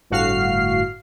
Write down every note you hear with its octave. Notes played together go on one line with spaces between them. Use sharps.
G1 A2 F#4 F5 F6 C7